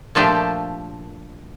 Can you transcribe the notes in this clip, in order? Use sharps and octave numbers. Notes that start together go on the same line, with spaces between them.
A#2 F3 A3 D4 G4